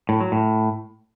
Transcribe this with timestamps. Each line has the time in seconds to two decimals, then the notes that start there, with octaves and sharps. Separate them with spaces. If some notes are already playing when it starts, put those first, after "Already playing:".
0.09 A2
0.20 F#3
0.32 A2